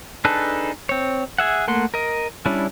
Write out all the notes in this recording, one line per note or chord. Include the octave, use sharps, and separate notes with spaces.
D4 D#4 G#4 A4 B4
C4 C#5
G#4 E5 F#5
A3 A#3 F#5 C6
A#4 D#5
G3 C#4 D4 E4